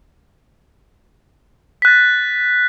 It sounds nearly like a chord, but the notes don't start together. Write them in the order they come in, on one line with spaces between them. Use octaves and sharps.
B6 F#6 A6